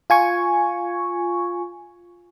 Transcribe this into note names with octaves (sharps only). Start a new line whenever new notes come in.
F4 G#5 C#6